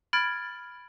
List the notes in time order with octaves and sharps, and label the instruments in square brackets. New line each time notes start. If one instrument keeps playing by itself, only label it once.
[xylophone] B5 F6 G#6 A6 D7